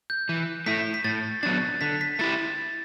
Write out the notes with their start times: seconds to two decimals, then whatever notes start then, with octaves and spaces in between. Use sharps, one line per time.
0.10 G6
0.29 E3
0.66 A3 E4 B6
0.94 B6
1.04 A2 A6
1.43 F#3 B3 D4 A6
1.81 D3 B6
2.01 B6
2.19 A3 E4 G4 A6